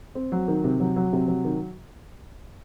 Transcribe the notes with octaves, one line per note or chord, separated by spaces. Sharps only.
C4
F#3
D#3
C3
F#3
F#3
C3
F#3
D#3